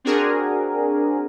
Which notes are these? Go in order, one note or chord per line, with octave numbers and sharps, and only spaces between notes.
C4 D4 F#4 G#4 A#4